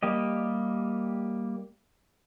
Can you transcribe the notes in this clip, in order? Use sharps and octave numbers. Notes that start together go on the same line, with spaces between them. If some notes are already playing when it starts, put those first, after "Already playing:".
G3 A#3 G4 D#5